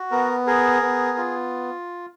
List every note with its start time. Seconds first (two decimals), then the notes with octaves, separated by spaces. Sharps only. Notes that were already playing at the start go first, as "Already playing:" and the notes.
Already playing: F#4
0.11 B3 A#4
0.47 G#4 A#4
0.82 B3
1.18 F4